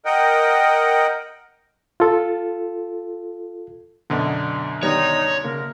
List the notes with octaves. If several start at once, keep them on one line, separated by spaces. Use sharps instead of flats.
A#4 D#5 F#5 G5
F4 A4
F#2 B2 D3 B3 D#5
D#3 G3 B3 D#4 C#5
C#3 A#3 A#4